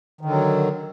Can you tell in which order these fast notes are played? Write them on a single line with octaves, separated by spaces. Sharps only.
D#3 D3 F#3